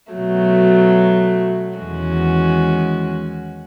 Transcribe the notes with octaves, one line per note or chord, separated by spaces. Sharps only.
B2 F#3 A3
E2 D#3 G#3 C#4 F#4